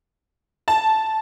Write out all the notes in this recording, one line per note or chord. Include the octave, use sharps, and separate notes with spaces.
A5